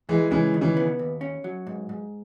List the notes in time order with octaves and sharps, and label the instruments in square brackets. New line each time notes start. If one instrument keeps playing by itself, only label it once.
[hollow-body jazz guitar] G#2 [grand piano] E3 G#3
[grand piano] C#3 E3 [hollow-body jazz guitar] G#3
[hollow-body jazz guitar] D#3
[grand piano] C#3 E3
[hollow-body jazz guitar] B3
D#2
C#4
F#3
G#2
G#2